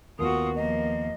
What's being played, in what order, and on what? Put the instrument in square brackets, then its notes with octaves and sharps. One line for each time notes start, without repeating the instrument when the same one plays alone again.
[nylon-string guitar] D#2 B3 [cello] F4 F#4 [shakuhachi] D#6
[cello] F3 A#3 [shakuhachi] D#5